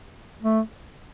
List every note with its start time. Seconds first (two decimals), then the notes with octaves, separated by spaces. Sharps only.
0.42 A3